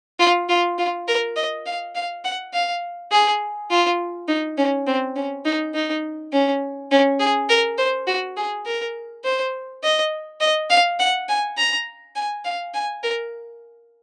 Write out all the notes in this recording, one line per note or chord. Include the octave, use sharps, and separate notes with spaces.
F4
F4
F4
A#4
D#5
F5
F5
F#5
F5
G#4
F4
D#4
C#4
C4
C#4
D#4
D#4
C#4
C#4
G#4
A#4
C5
F#4
G#4
A#4
C5
D#5
D#5
F5
F#5
G#5
A#5
G#5
F5
G#5
A#4